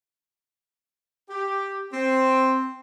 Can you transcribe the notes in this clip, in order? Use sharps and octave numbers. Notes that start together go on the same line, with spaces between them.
G4
C4